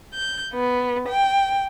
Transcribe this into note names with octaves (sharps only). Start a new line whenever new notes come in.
G6
B3
G5